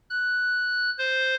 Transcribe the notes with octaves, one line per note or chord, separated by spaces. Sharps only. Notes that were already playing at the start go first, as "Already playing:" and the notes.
F#6
C5